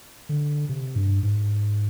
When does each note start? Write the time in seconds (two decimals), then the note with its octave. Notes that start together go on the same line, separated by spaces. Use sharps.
0.29 D3
0.69 C3
0.96 G2
1.23 G#2